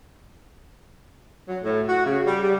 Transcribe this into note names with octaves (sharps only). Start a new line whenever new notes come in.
F#3
A2
F#4
C#3
G3
G3